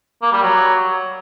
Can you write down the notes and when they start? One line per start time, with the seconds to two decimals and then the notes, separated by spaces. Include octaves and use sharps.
0.22 A#3
0.32 G3
0.42 F#3